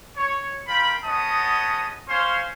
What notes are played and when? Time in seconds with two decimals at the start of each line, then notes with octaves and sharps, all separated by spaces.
0.16 C#5
0.67 F4 A#4 G5 B5
1.04 B3 C#4 G#4 D#5 A5 D#6
2.08 C#4 C5 C#5 F5 C6